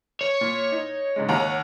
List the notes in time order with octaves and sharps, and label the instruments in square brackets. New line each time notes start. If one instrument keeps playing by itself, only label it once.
[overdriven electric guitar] C#5
[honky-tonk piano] A#2
D#4
G#2 C#3 G#3
D#2 F#5 A#5